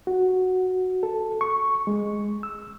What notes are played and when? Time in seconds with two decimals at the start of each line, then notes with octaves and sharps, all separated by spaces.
0.07 F#4
1.03 A4
1.41 C#6
1.87 G#3
2.43 E6